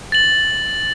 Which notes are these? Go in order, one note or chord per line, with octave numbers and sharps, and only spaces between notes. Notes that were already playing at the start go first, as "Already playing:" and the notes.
A6 F#7